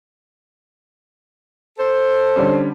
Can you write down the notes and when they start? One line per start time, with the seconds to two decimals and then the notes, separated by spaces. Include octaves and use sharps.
1.79 A4 C5
2.36 D3 G3 C#4